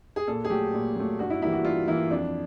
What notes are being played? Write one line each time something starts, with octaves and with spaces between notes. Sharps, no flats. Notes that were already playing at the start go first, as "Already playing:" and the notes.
G#4
A#2 A4
G#4
F#3 A3 G4
A#2
F#3 A3
G2 F#4
E4
E3 G3 A#3 E4
F#4
G2 F4
E3 G3 A#3 E4
F2 D4